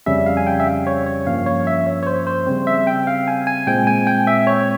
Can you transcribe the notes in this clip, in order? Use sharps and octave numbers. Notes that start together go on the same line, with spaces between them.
F2 C#3 G3 C#4 E5
F5
G#5
G5
E5
F5
C#5
C#5
G2 F3 A#3 C#4 F5
C#5
E5
C#5
C#5
C5
C5
C#3 G3 C4
E5
G5
F5
G#5
G#5
A#2 G#3 C4 G5
G#5
G5
E5
C#5